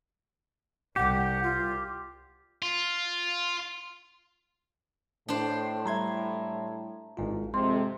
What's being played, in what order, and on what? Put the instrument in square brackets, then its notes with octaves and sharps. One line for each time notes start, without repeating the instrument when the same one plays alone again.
[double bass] C2 [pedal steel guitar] G4 [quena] F#5
[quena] F4
[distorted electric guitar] F4
[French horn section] A2 [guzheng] D4 C5
[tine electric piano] G3 C6 G#6 [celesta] E5 A#5
[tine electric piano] G#1 G#2 F4
[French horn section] F2 C3 [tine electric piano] G#3 [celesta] C6